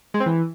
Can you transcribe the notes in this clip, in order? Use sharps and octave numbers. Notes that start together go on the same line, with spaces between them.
G#3
C4
E3